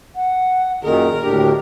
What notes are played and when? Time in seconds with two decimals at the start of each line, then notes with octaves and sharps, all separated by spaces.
0.16 F#5
0.83 F#2 A#2 D#3 G#4 A#4
1.23 D2 A2 D4 G4